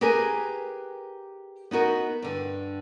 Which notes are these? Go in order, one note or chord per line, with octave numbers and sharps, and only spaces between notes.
G4 G#4 A#4 B4 G#5
B3 D#4 F#4 A#4
G2 D3